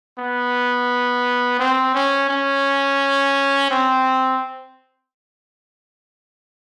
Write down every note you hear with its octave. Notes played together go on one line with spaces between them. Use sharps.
B3
C4
C#4
C#4
C4